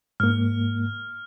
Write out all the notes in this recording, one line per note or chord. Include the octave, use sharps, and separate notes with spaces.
G#2 A#3 F6